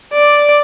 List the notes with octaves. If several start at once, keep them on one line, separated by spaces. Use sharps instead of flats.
D5